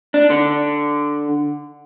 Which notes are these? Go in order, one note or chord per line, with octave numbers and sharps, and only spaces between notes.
D4
D3